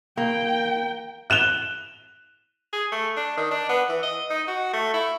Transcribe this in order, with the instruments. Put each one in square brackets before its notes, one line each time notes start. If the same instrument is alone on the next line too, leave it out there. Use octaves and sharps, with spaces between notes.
[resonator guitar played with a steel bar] A#3 [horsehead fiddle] G5
[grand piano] F#6 E7 F7 G7
[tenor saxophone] G#4
A3
D4
D#3
D4
B3
E3
D#5
D#4
F#4
A3
E4